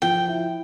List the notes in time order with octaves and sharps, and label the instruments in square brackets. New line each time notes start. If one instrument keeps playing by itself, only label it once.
[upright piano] F3 [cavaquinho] G5
[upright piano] E4